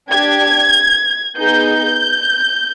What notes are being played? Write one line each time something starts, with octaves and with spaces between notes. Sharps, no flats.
D4 G4 G#6
B3 D#4 G#4 G6